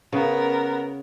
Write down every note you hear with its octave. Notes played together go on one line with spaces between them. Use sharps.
C#3 B3 A#4